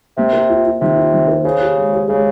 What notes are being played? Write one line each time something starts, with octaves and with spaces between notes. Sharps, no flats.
C3 A#3
C5
F4
F4
C3 D#3
F4
D#3
C5
C#3 C5
G4
G#3
G4
C#3 G#3